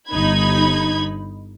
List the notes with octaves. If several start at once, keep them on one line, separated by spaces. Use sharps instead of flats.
G1 D#4 B5 G#6